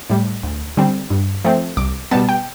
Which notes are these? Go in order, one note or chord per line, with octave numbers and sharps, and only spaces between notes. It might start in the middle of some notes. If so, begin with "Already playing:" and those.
A2 G3
D2
D3 G3 C4
G2
F3 A3 C4
C2 D6
B2 G3 B3 A5
G5